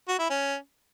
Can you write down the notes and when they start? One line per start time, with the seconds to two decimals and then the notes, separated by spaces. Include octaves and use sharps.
0.08 F#4
0.19 E4
0.30 C#4